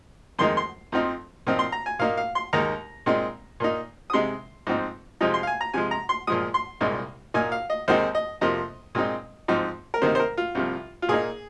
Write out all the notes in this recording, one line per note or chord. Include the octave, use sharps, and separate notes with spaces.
F2 D#3 G#3 D#4 C6
C6
F2 F3 C4 D#4
A#2 F3 C4 D#4
C6
A#5
G#5
A#2 A#3 D#4 F5
F5
C6
D#2 D#3 G#3 D#4 A#5
A#2 G#3 C4 D#4
A#2 A#3 D#4
D#6
C3 G#3 D#4 C6
G#2 F3 C4 D#4
F2 C3 F3 G#3 D#4
C6
F5
G#5
A#5
C3 F3 G#3 G#5
A#5
C6
A#2 F3 G#3 D#6
C6
C2 A#2 G#3 D#4
A#2 A#3 D#4 G#5
F5
D#5
D#2 D#3 G#3 C4 D#4 C5
D#5
F2 C3 F3 A#3 D#5
A#2 G#3 C4 D#4
G#2 F3 C4 D#4
A#4
C3 D#3 A#3 D#4 C5
C5
A#4
F4
C2 C3 F3
F4
A#2 A#3 D#4 G#4